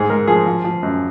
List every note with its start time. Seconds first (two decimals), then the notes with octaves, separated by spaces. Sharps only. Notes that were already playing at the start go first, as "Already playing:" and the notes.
Already playing: G#2 G#4
0.10 G#3 A#4
0.27 F3 G#4
0.46 F3
0.64 F3
0.83 F#2